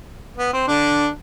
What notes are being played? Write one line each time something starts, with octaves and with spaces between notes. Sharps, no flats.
B3
C4
D3 D4